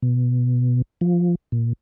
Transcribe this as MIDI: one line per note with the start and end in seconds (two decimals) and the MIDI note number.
0.02 0.82 47
1.01 1.35 53
1.52 1.73 46